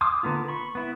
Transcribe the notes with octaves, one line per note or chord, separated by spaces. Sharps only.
C6 D6 D#6 F6
D3 A#3 B3 F4
B5 C#6
B3 E4